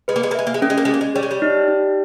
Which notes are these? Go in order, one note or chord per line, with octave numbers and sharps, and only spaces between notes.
G#3 B4
A#3
G#3
A#3
G#3 E5
A#3
G#3
A#3 C#4
G#3
A#3
G#3
A#3 G#4
G#3
G3 C#5
G#3
G3
D#4
D#4